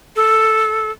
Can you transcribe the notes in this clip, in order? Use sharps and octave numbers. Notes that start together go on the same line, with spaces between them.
A4